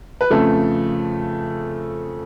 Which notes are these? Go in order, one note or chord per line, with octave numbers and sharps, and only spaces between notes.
B4
F2 C#3 F3 A3 A4